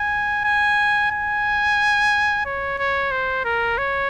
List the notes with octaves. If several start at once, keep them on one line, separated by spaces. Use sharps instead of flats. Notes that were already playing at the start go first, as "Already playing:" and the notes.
Already playing: G#5
G#5
G#5
C#5
C#5
C5
A#4
C#5